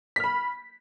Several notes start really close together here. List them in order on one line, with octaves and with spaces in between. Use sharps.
B6 F6 B5